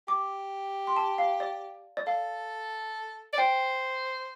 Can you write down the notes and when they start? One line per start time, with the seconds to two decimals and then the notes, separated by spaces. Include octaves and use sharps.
0.08 G4 D6
0.87 C6
0.97 A5
1.18 F5
1.40 D5
1.97 D5
2.07 A4 F5
3.33 D5
3.38 C5 G5